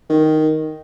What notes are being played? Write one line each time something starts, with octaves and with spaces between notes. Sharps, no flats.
D#3